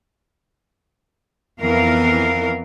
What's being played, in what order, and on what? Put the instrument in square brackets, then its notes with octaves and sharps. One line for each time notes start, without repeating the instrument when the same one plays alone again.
[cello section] F2 E3 B3 A#4 F5